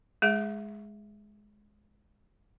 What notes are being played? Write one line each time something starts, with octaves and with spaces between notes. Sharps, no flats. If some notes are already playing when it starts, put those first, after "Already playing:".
G#3 G#4 E5